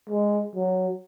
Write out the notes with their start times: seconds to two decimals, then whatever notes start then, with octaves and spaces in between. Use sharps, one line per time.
0.09 G#3
0.55 F#3